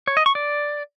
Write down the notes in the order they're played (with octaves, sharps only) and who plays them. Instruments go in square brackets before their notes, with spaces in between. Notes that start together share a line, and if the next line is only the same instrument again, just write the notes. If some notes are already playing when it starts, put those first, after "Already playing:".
[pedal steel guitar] C#5
D#5
C#6
D5